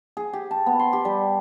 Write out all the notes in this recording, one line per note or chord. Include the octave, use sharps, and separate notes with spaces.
G#4
G4
A5
B3
C6
G4
G3